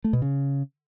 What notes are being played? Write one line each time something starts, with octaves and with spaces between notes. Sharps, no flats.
A3
B2
C#3